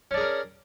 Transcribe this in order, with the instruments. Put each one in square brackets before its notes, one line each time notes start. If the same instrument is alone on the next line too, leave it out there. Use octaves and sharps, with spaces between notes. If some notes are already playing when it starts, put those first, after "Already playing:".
[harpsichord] C#4
D4
G#4
A#4